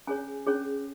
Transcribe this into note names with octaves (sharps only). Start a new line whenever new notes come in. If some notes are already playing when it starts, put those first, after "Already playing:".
C#4 G#4 C#5 G#5
C#4 G#4 C#5